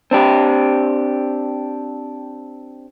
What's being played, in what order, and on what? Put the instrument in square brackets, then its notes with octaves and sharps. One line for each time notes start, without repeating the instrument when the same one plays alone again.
[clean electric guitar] C4 D4 G4